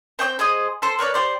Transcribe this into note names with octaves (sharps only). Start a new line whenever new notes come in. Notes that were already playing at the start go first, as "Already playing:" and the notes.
C4 G5 D6 G6
G#4 C5 D#5 D#6
A4 C5
A#4 B4 C#5 D5
G4 C5 D5